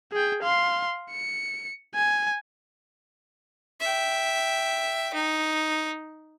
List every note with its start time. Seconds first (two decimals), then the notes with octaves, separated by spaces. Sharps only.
0.12 G#4 G5
0.43 F5 C6
1.11 C#7
1.95 G#5
3.81 E5 G5
5.14 D#4